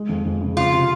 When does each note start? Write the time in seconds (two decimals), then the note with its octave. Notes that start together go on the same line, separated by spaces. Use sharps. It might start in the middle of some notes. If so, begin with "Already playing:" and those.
Already playing: G#3
0.09 F2
0.25 F2
0.41 C#3
0.57 C4 F4
0.73 C3